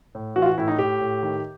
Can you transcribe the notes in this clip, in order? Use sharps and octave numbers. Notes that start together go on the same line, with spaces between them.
A2
E3 F#4
F4
F#4
A2 E4
D#4
A2 G4
A2
D#3